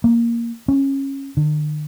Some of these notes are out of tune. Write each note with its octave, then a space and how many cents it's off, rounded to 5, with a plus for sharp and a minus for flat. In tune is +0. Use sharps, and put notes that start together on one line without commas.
A#3 +0
C#4 -20
D3 +45